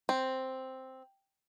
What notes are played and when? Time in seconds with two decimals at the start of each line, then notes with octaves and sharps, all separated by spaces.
0.09 C4